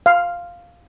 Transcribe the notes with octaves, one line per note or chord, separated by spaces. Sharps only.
F5